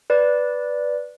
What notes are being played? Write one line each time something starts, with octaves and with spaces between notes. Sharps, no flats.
B4 D5